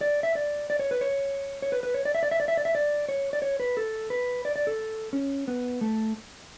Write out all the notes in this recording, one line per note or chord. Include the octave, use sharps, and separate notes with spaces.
D5
E5
D5
D5
C#5
B4
C#5
C#5
B4
B4
C#5
D5
E5
D5
E5
D5
E5
D5
E5
D5
C#5
D5
C#5
B4
A4
B4
D5
D5
A4
C#4
B3
A3